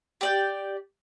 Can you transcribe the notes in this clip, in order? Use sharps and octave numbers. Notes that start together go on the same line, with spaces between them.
G4 D5 G5